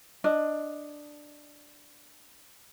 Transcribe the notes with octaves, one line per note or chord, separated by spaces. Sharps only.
D4 D#5